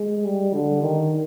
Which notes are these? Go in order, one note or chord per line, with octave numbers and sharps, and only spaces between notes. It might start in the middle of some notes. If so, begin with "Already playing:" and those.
Already playing: G#3
G3
D3
D#3